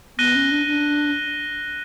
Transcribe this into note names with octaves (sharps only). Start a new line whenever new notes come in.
B3 F#6 A#6 D#7 G7
C#4
D4
D4